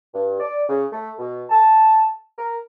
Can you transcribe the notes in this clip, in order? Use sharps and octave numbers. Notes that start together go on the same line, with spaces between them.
G2
D5
C#3
A3
B2
A5
A#4